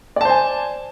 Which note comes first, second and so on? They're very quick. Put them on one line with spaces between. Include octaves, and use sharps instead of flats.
D5 A5 C5 G#5